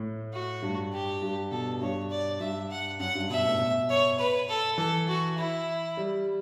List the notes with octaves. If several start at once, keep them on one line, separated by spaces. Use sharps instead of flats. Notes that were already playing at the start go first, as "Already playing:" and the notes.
Already playing: A2
F#4
G2
G4
G2
B2 A4
G2 C#5
D5
G2 E5
F#5
F#2 F#5
G2
B2 E5
A2
B2
C#5
B4
A4
E3 A4
F#4
E4
G3